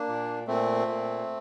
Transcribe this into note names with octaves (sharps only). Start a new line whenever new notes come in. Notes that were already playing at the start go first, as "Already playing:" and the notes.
Already playing: A#3 D4
A#2
A#2 A3 C4
A#2